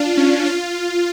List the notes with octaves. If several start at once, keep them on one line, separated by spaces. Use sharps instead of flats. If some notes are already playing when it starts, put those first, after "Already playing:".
Already playing: D4 F4
C#4
F4